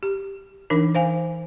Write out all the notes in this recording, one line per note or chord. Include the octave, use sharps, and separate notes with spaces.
G4
E3 D4 D#4 A#4
C5 F5 G#5